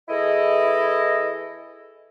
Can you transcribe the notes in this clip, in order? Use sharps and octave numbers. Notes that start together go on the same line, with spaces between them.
E3 E4 G#4 A4 D#5